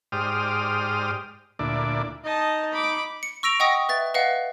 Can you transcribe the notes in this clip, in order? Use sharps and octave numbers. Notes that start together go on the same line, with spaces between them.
G#2 G4 C5 D5 D#6 F6
D2 A#2 D4 E4 D5
D#4 D#5 A5
B5 D6
C#7
C#6 E6 A#6 D7 F7
D#5 F#5 G5 C#6 D#6 A#6
B4 E5 A6
B4 D#5 F5 F#5